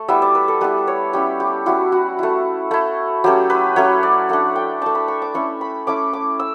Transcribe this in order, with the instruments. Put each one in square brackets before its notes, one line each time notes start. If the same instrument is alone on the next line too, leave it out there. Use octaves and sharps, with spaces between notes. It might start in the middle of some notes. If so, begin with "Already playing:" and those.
Already playing: [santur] A3
G3 B3 E4 E5
D5
B4
A4
G3 B3 E4 B4
C#5
G3 C#4 E4 G4
G4
G3 C#4 E4 F#4
F#4
A3 E4
A3 E4
F#3 A3 C#4 G4
B4
F#3 A3 C#4 C#5
D5
A3 D4 F#5
G5
A3 D4 A5
B5
C#6
D6
A3 C#4 E4 C#6
B5
A3 C#4 E4 D6
D6
E6